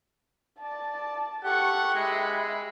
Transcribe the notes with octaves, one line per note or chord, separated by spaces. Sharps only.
D5 A5
G4 A4 F#5 C#6
G#3 E5 B5